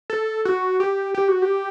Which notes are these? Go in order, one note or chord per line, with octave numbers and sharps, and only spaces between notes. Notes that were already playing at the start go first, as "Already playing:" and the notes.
A4
F#4
G4
G4
F#4
G4